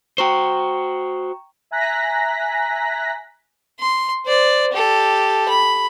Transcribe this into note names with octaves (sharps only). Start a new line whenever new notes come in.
F#4 C5 G5 A#5 C#6
E5 G#5 A#5 F#6 A#6 B6
C6
C5 D5
G4 A4
B5